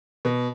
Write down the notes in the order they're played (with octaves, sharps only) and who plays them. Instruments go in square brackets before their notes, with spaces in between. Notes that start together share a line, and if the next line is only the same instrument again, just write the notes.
[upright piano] B2